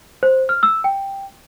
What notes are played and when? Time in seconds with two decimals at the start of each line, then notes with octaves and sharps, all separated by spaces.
0.23 C5
0.49 F6
0.63 E6
0.84 G5